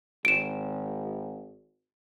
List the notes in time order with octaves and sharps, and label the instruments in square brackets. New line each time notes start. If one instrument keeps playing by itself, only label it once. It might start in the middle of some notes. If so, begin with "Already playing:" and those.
[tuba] G#1 [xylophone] D7 E7